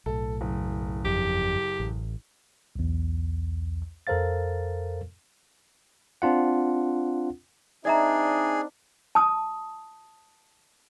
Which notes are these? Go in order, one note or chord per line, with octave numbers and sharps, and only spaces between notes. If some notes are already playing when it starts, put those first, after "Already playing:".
B1 A2 A4
F#1
G1 F2 G4
A1
B1 E2
F2 A4 A#4 C5 F5 A6
C4 D4 F4 F#5
C4 D4 D#4 G#4 D5 E5 A#5
A5 D#6